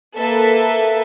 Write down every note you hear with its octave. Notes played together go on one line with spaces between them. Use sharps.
A#3 A4 B4 E5